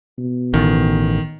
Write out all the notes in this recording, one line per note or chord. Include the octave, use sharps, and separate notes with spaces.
B2
A1 D#3